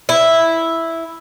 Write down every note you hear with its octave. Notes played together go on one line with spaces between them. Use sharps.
E4